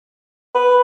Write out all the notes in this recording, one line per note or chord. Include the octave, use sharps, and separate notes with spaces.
B4